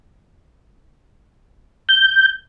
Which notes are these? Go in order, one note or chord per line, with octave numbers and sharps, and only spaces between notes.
G6